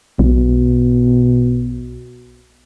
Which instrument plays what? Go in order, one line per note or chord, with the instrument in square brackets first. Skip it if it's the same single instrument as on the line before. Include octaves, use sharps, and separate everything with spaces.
[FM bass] B1 [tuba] B2